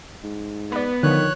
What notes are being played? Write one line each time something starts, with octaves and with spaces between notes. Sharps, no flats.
G#2
B3 B4 D5
D3 D#3 F3 C#5 F#6